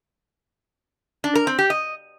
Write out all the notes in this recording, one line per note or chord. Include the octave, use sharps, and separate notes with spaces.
D4
A#4
C4
G4
D#5